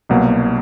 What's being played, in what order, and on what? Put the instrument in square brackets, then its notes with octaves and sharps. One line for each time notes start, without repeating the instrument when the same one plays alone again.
[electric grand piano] C2 B2 F#3 A#3